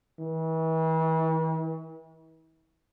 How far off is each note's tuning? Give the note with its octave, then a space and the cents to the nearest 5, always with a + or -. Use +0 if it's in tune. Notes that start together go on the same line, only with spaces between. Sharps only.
E3 -40